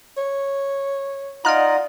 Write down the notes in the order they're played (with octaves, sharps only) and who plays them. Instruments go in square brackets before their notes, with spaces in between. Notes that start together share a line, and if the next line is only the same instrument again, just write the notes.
[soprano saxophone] C#5
[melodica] D#4 F4 D#5 [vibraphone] D5 F5 F#5 [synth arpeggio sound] A#5 F6